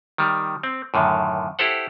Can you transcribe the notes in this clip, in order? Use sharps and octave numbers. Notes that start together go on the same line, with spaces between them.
D#3 G3
C4
F#2 A2 D3 D#3
E4 G4 A4 C5 F#5